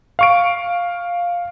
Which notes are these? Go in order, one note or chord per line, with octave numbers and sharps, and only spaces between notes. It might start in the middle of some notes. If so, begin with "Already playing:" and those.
F5 C#6 D7